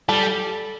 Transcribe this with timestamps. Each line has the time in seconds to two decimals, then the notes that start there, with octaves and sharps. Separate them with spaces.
0.09 G3 A4